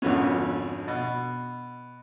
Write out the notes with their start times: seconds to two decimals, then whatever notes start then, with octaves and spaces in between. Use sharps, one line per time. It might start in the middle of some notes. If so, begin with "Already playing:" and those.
0.02 G#1 F2 D3 B3 C#4
0.88 B2